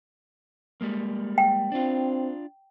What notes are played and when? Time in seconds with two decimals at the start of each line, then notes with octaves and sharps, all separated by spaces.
0.81 G3 G#3 A#3
1.38 G5
1.72 C4 D4 F4